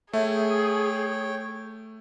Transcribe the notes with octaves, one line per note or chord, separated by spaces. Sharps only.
A3 G#4 C#5 E5 G5